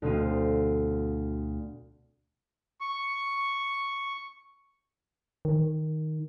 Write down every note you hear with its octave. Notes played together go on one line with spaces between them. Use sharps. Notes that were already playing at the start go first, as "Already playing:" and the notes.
D2 B2 C4 F5 D#7
C#6
D#3